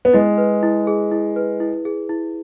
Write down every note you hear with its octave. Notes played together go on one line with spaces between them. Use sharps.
B3
G#3 E4
B4
E4
G#4
E4
B4
E4
G#4
E4